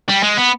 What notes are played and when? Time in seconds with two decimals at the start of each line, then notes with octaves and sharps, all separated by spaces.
0.09 G3
0.23 G#3
0.37 B3